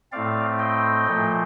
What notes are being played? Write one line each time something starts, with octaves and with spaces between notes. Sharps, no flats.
A2 A3 C4 D5 F5
D#5 G5
A#2 F3 A3